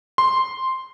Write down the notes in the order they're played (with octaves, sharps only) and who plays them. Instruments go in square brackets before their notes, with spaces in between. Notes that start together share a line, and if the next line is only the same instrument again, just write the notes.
[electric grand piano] C6